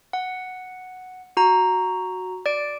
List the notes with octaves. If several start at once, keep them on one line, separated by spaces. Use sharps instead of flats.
F#5
F#4 A#5
D5 D7